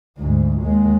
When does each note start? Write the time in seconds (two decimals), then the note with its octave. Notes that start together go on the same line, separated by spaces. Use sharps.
0.18 D2 G#2
0.61 D#2 G#3